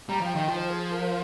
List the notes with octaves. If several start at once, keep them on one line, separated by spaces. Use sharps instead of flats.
G3 A#5
F3 G5
D#3 G5
F3
C5
G#4
A#4